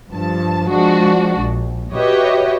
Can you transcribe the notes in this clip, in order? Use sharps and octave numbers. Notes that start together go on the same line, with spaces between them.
G2 F3 A5
F3 G#3 D4 F#4
A#1
F#4 G4 B4 C#5 D#5 E5